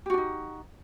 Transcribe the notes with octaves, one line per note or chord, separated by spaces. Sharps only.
D4 D#4 F#4 G4